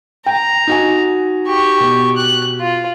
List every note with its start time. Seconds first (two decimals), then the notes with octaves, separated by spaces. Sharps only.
0.26 G5 A#5
0.67 D#4 F#4 G#5
1.47 G4 C#6
1.80 B2
2.16 F#6
2.60 F4